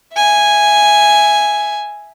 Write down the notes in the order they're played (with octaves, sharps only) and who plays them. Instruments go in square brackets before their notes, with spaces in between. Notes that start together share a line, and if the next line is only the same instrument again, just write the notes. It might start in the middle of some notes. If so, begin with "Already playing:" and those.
[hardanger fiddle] E5 G#5